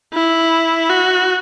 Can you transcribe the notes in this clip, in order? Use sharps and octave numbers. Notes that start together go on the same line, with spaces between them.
E4
F#4